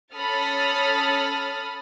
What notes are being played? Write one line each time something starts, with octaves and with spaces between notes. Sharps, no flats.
C#4 A4 B5 D#6 F6 A6